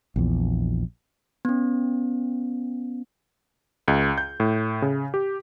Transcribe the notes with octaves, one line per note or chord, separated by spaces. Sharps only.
A#1 E2
B3 C#4
C#2
G6
A2
C#3
G4